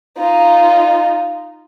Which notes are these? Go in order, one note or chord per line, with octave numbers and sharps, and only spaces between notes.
D#4 F4